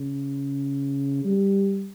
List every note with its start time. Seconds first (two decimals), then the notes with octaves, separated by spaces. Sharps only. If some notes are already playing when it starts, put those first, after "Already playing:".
Already playing: C#3
1.24 G3